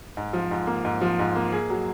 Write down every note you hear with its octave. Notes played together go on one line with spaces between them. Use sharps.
G#2
F3
G#2
A#3
G#2
F3
G#2
A#3
G#4
F#3